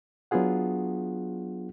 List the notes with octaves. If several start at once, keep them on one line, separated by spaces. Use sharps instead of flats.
F#3 B3 D4 F4 G#4 F#5